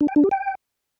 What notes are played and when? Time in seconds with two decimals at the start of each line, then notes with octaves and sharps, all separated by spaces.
0.01 D4
0.08 G5
0.16 D4
0.24 G4
0.31 G5